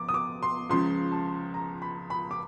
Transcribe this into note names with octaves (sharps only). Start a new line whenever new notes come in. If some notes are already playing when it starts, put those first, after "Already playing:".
Already playing: F3 D6
D#6
D6
C6
C#2 C#3 F3 C6
A5
A#5
B5
B5
D6